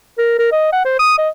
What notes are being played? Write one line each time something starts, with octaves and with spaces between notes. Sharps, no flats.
A#4
A#4
D#5
F#5
C5
D#6
D#5